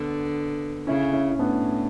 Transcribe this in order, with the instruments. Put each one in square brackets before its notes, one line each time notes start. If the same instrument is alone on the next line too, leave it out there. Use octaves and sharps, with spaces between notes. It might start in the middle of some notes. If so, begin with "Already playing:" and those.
Already playing: [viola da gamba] D3 [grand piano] B3
[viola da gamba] C#3 [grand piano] C#4 E4
[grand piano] C#4 E4
E4
[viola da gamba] A2 [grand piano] B3 D4